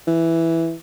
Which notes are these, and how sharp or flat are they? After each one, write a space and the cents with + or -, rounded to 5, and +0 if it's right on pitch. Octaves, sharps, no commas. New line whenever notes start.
E3 +0